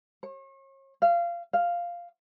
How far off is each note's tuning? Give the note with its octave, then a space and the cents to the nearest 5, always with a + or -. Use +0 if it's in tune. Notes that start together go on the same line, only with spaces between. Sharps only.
C#5 -40
F5 -20
F5 -5